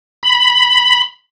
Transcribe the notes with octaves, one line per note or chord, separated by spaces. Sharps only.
B5